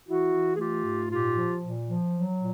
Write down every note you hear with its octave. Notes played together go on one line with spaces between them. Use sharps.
E3 E4 F#4
E3
G#4
A3 F4 G4
G#2
A#2 F4 G4
F3
A#2
F3
F#3
A#2